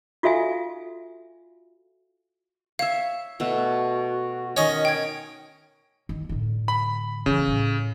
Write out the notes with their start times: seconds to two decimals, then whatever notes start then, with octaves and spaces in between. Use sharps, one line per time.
0.23 F4 F#4 A4 E5 F5 G#5
2.79 C#5 E5 F5
3.40 B2 A3 F#4
4.57 D#3 C#4 D#5
4.85 G5 G#6
6.09 D#3
6.29 A2 D3
6.68 B5
7.26 C#3 E3
7.47 A2